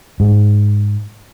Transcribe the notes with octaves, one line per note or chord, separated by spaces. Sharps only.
G#2